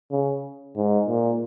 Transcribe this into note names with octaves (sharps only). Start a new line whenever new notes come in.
C#3
G#2
A#2